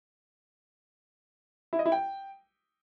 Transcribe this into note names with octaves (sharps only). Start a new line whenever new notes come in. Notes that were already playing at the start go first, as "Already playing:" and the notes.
E4
D#5
E4
G5